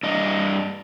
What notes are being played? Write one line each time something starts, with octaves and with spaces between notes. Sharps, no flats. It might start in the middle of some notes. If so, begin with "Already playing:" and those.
G2 D4 D#5